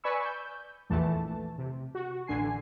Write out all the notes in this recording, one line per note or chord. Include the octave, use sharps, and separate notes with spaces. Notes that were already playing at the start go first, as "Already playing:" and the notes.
B4 D5 G#5 B5 C#6 E6
G6
A#1 E2 E3 A3 A5
C3
F#4
A1 D3 G#5 C7